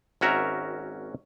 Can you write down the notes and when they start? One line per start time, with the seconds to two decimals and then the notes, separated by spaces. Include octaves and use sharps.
0.21 G#1 C#4 F#4 A#4 E5 A#5